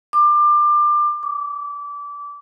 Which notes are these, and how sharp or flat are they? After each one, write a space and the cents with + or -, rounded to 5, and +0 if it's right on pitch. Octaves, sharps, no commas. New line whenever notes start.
D6 +25
D6 -25